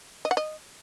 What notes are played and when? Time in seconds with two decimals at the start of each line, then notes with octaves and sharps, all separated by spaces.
0.25 D#5
0.31 F#5
0.37 D#5